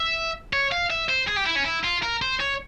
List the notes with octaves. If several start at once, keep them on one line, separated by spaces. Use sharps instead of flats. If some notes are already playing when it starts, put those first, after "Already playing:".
Already playing: E5
C#5
F5
E5
C5
G#4
G4
E4
C#4
E4
F4
A#4
C5
C#5